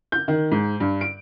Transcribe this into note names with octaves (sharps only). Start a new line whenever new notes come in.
G6
D#3
G#2
G2
D7